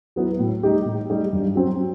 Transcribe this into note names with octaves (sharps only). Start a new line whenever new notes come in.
F#3 B3 E4
A2
G3 D#4 G4
A2
G3 D#4 G4
G2
F#3 C4